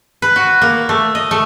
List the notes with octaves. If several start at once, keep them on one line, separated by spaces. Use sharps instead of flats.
B4
F#4
A#3
A3
D#5
A3